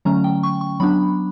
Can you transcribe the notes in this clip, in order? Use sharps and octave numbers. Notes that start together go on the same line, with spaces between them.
D3 F#3 A3 C#4 A#5
G5
C#6
C#6
F#3 B3 D4 B5